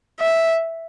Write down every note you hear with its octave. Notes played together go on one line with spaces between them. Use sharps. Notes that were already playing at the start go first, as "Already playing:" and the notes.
E5